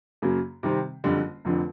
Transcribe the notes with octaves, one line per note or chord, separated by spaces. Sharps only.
F#2 C#3 F#3 A#3
C3 D#3 G3 C4
F#1 F2 D3 G3
F1 F2 D3 F3